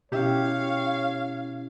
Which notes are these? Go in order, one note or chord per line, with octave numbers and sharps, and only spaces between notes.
B2 C#4 E4 G4 C#5 F5